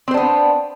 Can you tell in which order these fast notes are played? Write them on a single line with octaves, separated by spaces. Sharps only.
C4 C5 D4 B3